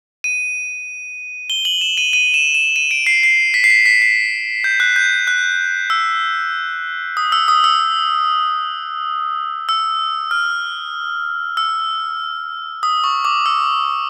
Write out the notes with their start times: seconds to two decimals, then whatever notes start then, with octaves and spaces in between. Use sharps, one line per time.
0.24 D#7
1.50 G7
1.65 F#7
1.81 E7
1.98 D#7
2.13 D#7
2.34 E7
2.54 E7
2.76 D#7
2.91 D7
3.06 C7
3.23 C7
3.54 B6
3.64 C7
3.70 B6
3.86 B6
4.02 C7
4.64 G6
4.80 F#6
4.96 G6
5.27 F#6
5.90 E6
7.17 D#6
7.32 E6
7.48 D#6
7.64 E6
9.69 E6
10.31 F6
11.57 E6
12.83 D#6
13.04 C#6
13.25 D6
13.46 E6